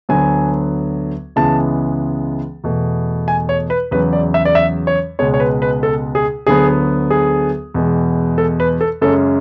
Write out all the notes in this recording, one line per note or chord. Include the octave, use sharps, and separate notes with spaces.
D2 D3 F#3 B3 G#5
C#2 C#3 E3 G#3 B3 A5
E2 B2 A3
G#5
C#5
B4
E2 C#3 F#3 B4
D5
E5
D5
E5
C#5
C#2 B2 G#3 C#5
C#5
B4
B4
A4
G#4
D2 D3 F#3 B3 G#4
G#4
E2 B2 G#3
A4
B4
A4
F#2 C#3 G#3 C#4 A4